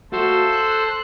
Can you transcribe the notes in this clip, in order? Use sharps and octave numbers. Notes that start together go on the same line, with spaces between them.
A3 F#4 A4 C5 F5
C6 F#6